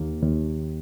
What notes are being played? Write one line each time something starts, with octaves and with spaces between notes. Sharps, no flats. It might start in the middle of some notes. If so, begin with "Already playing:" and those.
Already playing: D#2 A#3
D#2